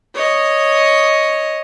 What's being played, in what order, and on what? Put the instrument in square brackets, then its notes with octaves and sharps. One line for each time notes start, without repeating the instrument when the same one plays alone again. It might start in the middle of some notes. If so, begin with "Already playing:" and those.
[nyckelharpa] C#5 D#5